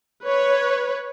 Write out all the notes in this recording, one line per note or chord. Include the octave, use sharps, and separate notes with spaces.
B4 C#5